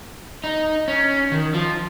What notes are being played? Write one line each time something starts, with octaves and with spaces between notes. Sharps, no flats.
D#4
C#4
D#3
F3